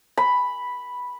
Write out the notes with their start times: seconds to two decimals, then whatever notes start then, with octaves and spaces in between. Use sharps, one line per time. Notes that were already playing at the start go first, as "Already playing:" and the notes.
0.17 B5